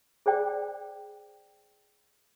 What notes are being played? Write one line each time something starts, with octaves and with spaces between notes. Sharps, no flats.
G#4 C5 D5 G5